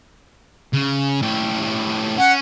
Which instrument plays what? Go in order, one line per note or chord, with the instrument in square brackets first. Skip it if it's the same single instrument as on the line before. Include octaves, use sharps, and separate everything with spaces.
[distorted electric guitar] C#3
A2 G4
[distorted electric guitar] C#4 [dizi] F#5